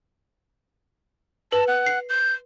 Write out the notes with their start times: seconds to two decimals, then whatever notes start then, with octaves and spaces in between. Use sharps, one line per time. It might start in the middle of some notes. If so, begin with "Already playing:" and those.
1.52 B4 A5
1.67 F#5
1.86 C7
2.09 G6